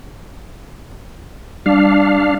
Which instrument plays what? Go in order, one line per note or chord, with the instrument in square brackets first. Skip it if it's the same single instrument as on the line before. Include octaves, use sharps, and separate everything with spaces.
[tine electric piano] G3 [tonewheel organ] D4 F5